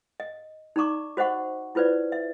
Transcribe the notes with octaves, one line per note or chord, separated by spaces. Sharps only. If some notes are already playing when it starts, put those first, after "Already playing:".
D#5
D#4 D5 A#5 C#6 D6
F#4 C5 D#5 F#5 C#6
E4 F4 B4 C5 D5
E5